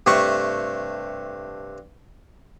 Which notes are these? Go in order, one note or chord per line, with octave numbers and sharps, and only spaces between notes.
G2 C3 A3 F#5 A5 C#6